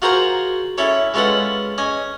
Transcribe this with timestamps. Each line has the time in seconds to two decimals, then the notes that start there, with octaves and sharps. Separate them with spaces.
0.02 F4 F#4 G#4 A#4 C5 A#5
0.78 C#4 E4 A4 C#5
1.14 G#3 C#4 F4 A4 B4 F#5
1.78 C#4 D#5 G#5